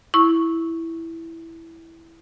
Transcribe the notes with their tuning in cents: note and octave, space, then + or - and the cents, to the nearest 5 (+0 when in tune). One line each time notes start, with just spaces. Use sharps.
E4 +0 C#6 -5